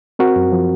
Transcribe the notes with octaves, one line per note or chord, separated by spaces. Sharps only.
C4 F#4 A#4
F#2
F3